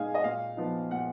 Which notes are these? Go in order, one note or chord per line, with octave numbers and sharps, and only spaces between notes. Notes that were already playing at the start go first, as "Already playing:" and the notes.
Already playing: A#2 G#3 D#4 F5 G#5
D#5
A#2 F5
F3 B3 D#4
A#2 F#5